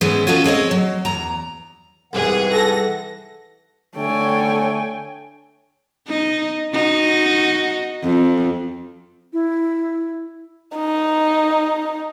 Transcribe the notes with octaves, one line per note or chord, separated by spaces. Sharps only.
G#2 E3 G#3 B3 C#4
C#4 F4 F#4 A4 D#5
G#3 C4 C#5 D#5
F#3
E2 A#5
C2 G#2 E3 G#4 F#5
A4 A#6
D3 A3 A4 C#5 G5 G#5
D#4
D#4 F#4
F2
E4
D#4